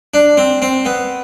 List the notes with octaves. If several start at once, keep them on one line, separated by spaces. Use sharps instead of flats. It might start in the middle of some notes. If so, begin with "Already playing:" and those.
D4
C4
C4
B3